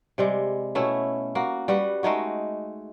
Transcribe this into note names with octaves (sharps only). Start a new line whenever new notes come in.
C3 G3 G#3
B2 A3 C#4 E4
A#3 F#4
G3 F#4 B4 F#5
G#3 A3 D#4 F#4